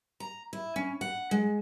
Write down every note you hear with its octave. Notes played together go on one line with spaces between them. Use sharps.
A#5
E4
C#4
F#5
G#3